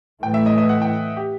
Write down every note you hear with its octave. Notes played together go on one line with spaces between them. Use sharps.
A2 E3 A3 G5
E5
D#5
D#5
F#5
G5
G4